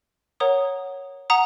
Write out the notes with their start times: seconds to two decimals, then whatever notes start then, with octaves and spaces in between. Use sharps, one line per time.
0.40 A#4 C#5 F#5 A#5 D#6
1.30 F#5 A#5 D#6